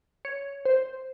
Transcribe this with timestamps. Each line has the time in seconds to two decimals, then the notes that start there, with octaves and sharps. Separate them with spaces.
0.25 C#5
0.65 C5